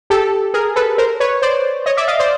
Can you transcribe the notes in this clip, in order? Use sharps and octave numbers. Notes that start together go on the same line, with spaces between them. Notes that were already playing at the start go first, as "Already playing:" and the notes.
G4 A4
G#4 A#4
A4 B4
A#4 C5
B4 C#5
C5 D5
C#5 D#5
D5 E5
D#5 F5
C5 D5